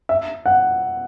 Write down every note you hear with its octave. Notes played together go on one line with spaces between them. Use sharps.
E5
F#5